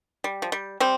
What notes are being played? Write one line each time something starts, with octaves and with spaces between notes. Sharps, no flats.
G3
F3
G3
G3 C4